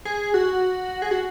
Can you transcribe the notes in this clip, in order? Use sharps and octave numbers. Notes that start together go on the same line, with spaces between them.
G#4
F#4
G#4
F#4